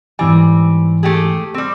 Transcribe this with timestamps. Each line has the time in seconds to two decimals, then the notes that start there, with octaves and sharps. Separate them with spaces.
0.19 G#2 E3 G3 C4 G#5
1.03 A3 G4 G#4
1.54 G3 C4